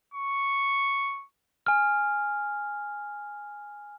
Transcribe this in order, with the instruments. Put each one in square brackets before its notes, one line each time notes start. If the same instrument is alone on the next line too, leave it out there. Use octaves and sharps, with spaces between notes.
[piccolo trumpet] C#6
[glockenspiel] G#5 F6